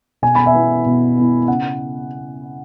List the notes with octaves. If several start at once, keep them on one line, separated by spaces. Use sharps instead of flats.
B2 G#5
B5
E5 G#5
B3 E4
B2
B3 E4
C#3 F#5